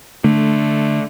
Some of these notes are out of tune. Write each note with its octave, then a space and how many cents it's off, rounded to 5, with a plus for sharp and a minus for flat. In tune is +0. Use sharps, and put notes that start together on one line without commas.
D3 +5 A3 -5